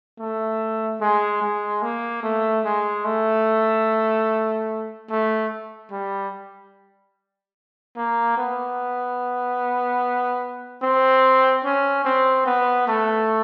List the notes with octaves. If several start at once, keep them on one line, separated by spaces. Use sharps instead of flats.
A3
G#3
G#3
A#3
A3
G#3
A3
A3
G3
A#3
B3
C4
C#4
C4
B3
A3